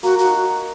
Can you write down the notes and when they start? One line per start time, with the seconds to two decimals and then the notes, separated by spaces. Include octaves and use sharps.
0.03 A#3 F#4
0.19 F#4
0.24 D#4